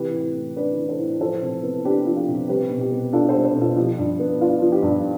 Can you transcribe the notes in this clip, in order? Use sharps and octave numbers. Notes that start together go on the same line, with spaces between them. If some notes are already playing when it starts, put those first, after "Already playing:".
Already playing: C3 E3 G4 B4
A2
A3
D4 B4 D5
E3
A4 C5
A2
F3 A4 C5
C3
B3
D4 G4 B4
F3
F4 A4
C3
G3 G4 B4
B2
G4
B3
D4 F4 A4
A4 C5
G3
A4 C5
B2
F4 A4
F3 G4
G2
B3
D4 F4
F3
G4
G2